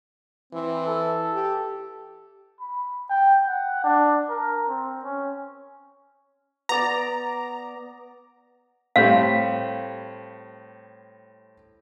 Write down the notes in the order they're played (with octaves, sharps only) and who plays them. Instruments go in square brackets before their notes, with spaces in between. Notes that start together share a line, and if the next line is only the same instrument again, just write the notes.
[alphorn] E3 [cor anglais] C4
[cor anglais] A4
[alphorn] G4
[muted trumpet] B5
G5
F#5
D4
A#4
C4
C#4
[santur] B3 D5 [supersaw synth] A#5
[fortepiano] A2 G3 C4 [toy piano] F5